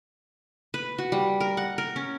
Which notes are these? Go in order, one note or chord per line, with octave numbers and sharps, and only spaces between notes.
B4
F#4
G3
A#4
F#5
A#4
C#4